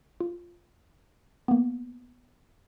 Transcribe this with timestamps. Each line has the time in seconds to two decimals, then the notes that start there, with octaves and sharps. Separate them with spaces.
0.20 F4
1.48 A#3 B3